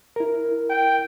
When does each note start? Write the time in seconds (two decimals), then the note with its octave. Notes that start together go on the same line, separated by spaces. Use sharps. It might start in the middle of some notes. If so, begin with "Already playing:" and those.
0.16 E4 A#4
0.70 G5